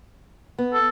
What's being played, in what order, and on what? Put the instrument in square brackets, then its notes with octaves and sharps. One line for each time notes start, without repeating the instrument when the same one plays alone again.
[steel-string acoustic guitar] B3
[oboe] A4